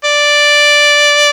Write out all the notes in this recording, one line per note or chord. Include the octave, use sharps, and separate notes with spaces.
D5